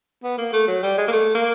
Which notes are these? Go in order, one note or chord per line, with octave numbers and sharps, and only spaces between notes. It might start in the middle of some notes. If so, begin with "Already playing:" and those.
B3
A#3
A3
F#3
G3
G#3
A#3
A3
A#3